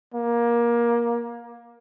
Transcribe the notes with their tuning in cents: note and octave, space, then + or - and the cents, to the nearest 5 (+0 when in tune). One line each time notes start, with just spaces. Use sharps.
A#3 +20